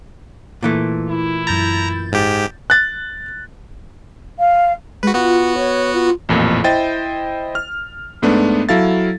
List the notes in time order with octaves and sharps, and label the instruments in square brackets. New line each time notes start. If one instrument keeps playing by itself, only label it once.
[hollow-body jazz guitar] A#2 E3 A3
[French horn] E4
[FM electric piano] F#2 G6 A6 [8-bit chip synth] A#5
[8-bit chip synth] G#2 G4
[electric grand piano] F#6 A6
[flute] F5
[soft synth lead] G#3 [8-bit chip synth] F#4 B4
[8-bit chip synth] B3 F#4 [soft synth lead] F4
[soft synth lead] C#5
F4
[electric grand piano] A1 F2 A#2
E4 C5 D#5 G5 A6
F6
G#2 A3 B3 D4
F#3 E4 A4 F5 A6